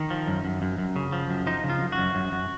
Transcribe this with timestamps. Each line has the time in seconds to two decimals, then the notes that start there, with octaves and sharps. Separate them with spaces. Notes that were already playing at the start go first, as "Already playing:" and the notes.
Already playing: D#3 D#4
0.10 F3
0.27 F#2
0.45 F#2
0.62 F#2
0.78 F#2
0.96 C#3
1.12 F3
1.30 F#2
1.47 F3 D#4
1.64 C#3
1.70 F4
1.81 F#2
1.92 F#4
1.98 F#2
2.15 F#2
2.32 F#2